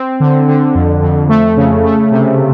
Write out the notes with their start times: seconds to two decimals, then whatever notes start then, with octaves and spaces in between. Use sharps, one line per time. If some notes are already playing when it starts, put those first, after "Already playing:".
Already playing: C4
0.20 D3
0.48 D3
0.75 F2
1.02 F2
1.29 A3
1.57 C#3
1.85 A3
2.11 C3